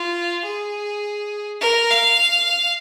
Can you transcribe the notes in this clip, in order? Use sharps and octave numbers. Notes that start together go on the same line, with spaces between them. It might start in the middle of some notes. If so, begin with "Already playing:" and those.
Already playing: F4
G#4
A#4
F5